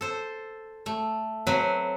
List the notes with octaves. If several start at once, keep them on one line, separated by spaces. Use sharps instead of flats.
A4 C5
A3
F#3 C4 B4